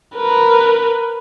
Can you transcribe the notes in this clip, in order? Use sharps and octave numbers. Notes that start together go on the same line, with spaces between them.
A#4 B4